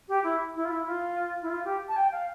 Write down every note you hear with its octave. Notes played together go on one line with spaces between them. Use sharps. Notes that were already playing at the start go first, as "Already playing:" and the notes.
G4
E4
E4
F4
E4
F4
E4
F4
G4
A5
G5
F5